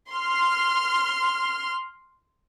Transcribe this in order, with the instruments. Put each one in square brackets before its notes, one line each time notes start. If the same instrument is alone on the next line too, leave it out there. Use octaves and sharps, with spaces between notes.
[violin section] C6 F6